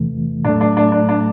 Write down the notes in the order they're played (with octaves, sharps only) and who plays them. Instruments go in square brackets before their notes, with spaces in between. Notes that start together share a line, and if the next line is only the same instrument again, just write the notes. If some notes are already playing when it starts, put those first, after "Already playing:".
Already playing: [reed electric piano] E2 C3 E3 A3
[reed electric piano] A2 F#3 A3 [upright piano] D4
[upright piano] D4
D4
D4
D4